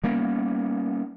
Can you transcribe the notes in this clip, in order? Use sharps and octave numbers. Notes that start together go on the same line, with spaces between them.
G3 A#3 B3 C#4